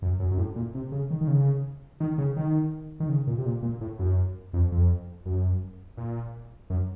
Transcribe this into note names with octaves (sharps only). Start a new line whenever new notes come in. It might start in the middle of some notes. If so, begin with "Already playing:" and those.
F#2
F#2
F#2
A2
A#2
C3
C#3
D#3
D#3
C#3
D#3
C#3
D#3
D#3
C#3
A#2
C3
A#2
A#2
A2
F#2
F2
F2
F#2
A#2
F#2